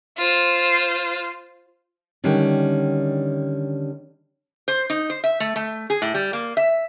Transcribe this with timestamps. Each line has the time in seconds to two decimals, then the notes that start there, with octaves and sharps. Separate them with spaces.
0.18 F4 C5
2.24 D3 D#3 G3 C#4
4.68 C5
4.90 D#4
5.10 C5
5.24 E5
5.40 A3
5.56 A3
5.90 G#4
6.02 A2
6.14 G3
6.33 A#3
6.57 E5